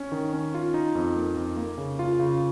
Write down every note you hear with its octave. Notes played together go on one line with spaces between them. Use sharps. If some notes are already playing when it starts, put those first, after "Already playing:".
Already playing: C#4
D#3
C#4
F4
D#4
F2
A#3
F2
A#3
C#3
F4
C#3